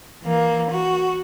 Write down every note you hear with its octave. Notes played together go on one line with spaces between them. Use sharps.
E3 A#3
F#4